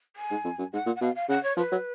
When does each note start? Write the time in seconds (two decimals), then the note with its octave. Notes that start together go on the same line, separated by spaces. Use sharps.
0.16 G#5
0.31 G#2
0.44 F2
0.59 F#2
0.73 G#2 F#5
0.86 A#2
0.95 F#5
1.01 B2 F5
1.15 F5
1.29 C#3 F#5
1.43 C#5
1.57 F3 B4
1.72 F#3